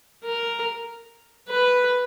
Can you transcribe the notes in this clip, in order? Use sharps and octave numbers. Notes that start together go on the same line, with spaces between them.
A#4
B4